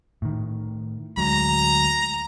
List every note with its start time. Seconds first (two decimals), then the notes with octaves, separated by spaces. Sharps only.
0.22 A2 D#3
1.17 D2 F#3 G#3 A#5